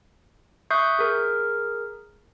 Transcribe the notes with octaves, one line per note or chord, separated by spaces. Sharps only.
E5 C#6 D#6 F#6 G6 C7
G#4 A#4